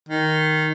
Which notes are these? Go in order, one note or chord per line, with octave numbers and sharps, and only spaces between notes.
D#3